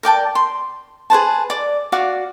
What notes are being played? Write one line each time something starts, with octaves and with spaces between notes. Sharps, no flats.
A#4 D5 G5 A5
C6
G#4 B4 C5 A5
D5 D6
F#4 D5 F5 D6